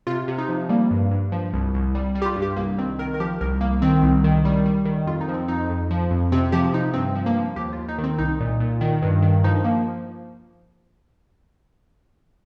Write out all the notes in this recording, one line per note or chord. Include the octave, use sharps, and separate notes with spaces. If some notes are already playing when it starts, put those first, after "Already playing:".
C3 F4
C3
D#4
F3
G3 A#3
G2
G2
F3
C2
C2
G3
G3
G4
F4
G2
G4
C2 A#3
D#3 C4
D#3 A#4
A#4
F3 G4
C2 A#4
C2 A#3
D#3 C4
C2
D#3
G3
G3
D#3
F2 F4
D#4
F3
C4
F2 D#4
F2
F3
F2
C3 C4
F3 G4
C3 D#4
G2 C4
F3
A#3
F3
D#2 G4
F4
D#2
D#4
D#3
C4
C2 D#4
A#2
A#2
D#3
G2
D#3
F3 D#4
F3 A#3